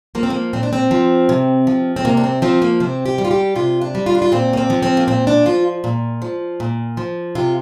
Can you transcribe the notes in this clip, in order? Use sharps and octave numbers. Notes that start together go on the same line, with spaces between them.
F3 A#3
C4
A#3
A#2 C4
D4
C4
F3
C3
F3
C4
C3 A#3
D4
C4
F3 C4
A#3
C3 C4
G4
G3
F4
G4
C3 F4
D4
G3
F4
D4
F4
A#2 C4
A#3
C4
F3
C4
A#3
A#2 C4
D4
F3 F4
A#2
F3
A#2
F3
C3 F4